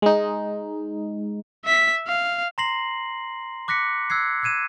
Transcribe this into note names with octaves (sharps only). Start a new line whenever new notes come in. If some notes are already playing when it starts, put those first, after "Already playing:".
G#3 D#4
E5 B6
F5
A#5 C6 A#6 C7 F#7
D6 F#6 A#6 B6 C#7
E6 F#6 G#6 C7
E6 F#6 G#6 D#7 E7